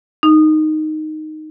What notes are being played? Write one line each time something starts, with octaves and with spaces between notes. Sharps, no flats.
D#4